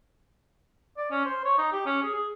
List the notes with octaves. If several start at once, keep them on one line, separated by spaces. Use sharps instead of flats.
D5
C#4
C5
C#5
D#4
G4
C#4
G#4
G#4